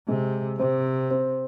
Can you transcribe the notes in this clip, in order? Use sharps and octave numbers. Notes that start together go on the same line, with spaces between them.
C3 G#3
C3 C4
C4